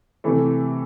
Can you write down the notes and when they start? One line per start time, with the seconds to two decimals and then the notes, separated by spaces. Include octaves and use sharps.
0.24 C3 E3 A3